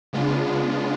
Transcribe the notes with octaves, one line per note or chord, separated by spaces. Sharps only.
C#3 G#3 B3 D4 F4